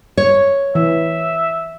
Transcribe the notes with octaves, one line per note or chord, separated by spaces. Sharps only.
C#5
E3 E5